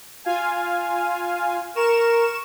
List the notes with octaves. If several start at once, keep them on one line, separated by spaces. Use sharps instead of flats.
F4 F5 G#5
A#4 C#6 E7